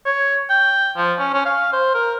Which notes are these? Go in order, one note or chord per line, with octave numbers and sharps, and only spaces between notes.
C#5
G5
F3
C#4
C#4
F5
C5
A#4